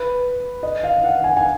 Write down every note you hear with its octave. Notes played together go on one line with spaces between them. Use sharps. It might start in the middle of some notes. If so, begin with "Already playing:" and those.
Already playing: B4
D#5
F5
F#5
G#5
G#5